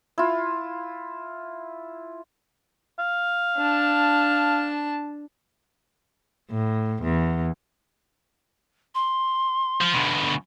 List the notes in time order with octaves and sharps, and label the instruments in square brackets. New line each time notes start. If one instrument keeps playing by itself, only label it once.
[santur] E4 F4
[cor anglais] F5
[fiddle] D4 A5
[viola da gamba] A2
E2
[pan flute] C6
[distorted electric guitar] F3
D2 B2